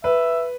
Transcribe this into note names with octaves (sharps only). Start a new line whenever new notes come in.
B4 E5